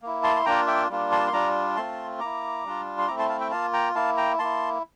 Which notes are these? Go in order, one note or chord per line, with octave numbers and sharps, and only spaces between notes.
A#3 E4
A5 C6
C6
A#3 D4 F4 G5 A#5
E5 G5
G3 A#3 D4 F4
A5 C6
C6
G3 D4 F4 A#5 D6
A3 C4 F4 A5 C6
A#3 E4 A#5 D6
G3 D4 F4
C6
A3 C4 E4 A#5 D6
A5 C6
F5 A5
E5 G5
A#3 F4 F5 A5
G5 A#5
A#3 E4 F5 A5
G5 A#5
A#3 E4 A5 C6